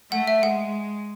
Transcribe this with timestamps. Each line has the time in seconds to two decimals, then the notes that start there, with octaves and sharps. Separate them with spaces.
0.12 A3 F#5
0.27 E5
0.42 G#3 F#5